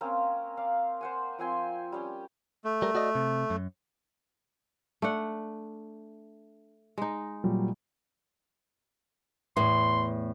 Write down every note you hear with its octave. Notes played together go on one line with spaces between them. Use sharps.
A#3 C4 C#4 A#4
D5 F5
C5 F#5 G#5
F3 C4 G#5 C6
G3 C#4 G5
A3
G3 A#4
F#4 D5 D#5
C3
F#2
A3 D4 F#5
G#3 D#4
A#2 F#3 G3
E2 A2 C6